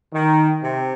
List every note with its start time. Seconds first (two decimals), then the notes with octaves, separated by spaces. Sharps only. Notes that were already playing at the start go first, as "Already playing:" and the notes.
0.14 D#3
0.63 C3